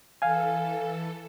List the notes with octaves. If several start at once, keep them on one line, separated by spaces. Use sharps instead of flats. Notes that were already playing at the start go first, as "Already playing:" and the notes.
E3 A4 F5 G#5